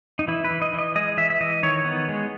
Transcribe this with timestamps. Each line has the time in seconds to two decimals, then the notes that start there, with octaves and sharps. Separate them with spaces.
0.19 D#4
0.28 E3 E4
0.44 B4
0.51 E3
0.62 D#5
0.73 E3
0.79 D#5
0.95 G#3 D#5
1.17 E3 E5
1.30 E5
1.41 E3 D#5
1.63 D#3 C#5
1.85 B3
2.08 G#3